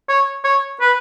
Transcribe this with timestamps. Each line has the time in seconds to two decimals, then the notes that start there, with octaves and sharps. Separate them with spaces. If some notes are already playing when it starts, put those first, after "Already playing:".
0.09 C#5
0.44 C#5
0.81 B4